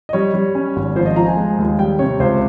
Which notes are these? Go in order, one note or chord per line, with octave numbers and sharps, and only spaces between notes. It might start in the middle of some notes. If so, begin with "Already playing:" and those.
D#5
G3 C#5
G3
C#4
G#1
F3 C5
D#5
F3 A#5
G#5
G#3
D#2
G3 G5
C3 C#5
C#2 C5